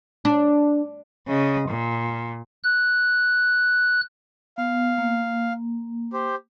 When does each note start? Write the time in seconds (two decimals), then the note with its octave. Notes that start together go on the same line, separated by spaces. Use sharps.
0.25 D4
1.28 C#3 D#5
1.69 A#2
2.64 F#6
4.58 B3 F5
4.98 A#3
6.13 G4 C5